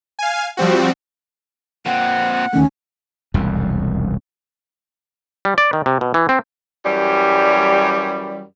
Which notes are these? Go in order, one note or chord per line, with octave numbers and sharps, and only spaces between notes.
F5 G#5
F3 G3 C4 F#4
A#2 C4 F#5
D2 D#3 A3 C#4
E1 C2 F2
G3
D5
D#3
C3
B2
E3
C4
F#2 E3 G3